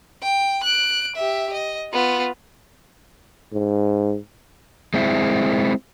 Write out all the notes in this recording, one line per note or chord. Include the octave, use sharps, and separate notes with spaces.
G5
F#6 D7
G4 E5
D#5
B3 F4
G#2
G#3 C4 E4